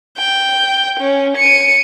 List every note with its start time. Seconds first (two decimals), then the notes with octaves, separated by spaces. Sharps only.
0.18 G5
1.00 C#4
1.37 C#7 D#7